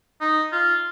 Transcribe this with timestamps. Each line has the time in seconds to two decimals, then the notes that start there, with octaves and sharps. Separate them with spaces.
0.21 D#4
0.52 F4